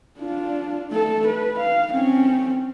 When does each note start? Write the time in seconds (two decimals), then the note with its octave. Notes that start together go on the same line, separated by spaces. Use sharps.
0.19 D4 F4
0.91 A3 A4
1.27 B4
1.59 F5
1.90 C4 C#4